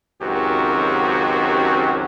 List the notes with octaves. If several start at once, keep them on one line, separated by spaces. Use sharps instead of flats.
C#2 F#2 D#3 C4 F#4 G4